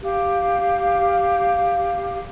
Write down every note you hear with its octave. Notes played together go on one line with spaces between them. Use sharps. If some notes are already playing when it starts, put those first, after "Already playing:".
G4 F5